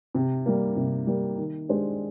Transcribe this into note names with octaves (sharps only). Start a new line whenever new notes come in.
C3
G3 A#3
C3
G3 A#3
D#3
G#3 D4 G4 C5